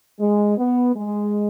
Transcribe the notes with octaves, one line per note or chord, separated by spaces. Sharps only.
G#3
B3
G#3